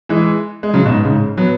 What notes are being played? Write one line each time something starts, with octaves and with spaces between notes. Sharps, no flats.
E3 G#3
G#3
C#3 F#3
B2
G#2
G#2 C#3
F#3 B3